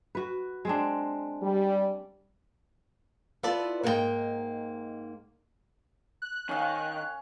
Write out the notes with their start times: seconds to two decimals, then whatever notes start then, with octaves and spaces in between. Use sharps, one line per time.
0.15 F#4 B4
0.65 G#3 C4 D4
1.42 G3
3.43 B3 E4 F4 A4 B4 D5
3.83 G#2 A#3 G4 B4 D#5 G5
6.22 F#6
6.49 D#3 C#4 F5